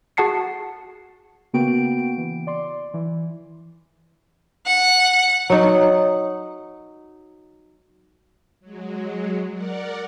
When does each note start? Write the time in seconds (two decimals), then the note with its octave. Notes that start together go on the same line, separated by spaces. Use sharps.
0.17 F#4 G#4 F#5 A5 C7 C#7
1.53 C#3 A#3 B3 F#4 G5 D7
2.18 E3
2.47 D5 C6
2.94 E3
4.68 F#5
5.50 F#3 D#4
8.60 F#3 G#3
9.53 A#4 D5 F#5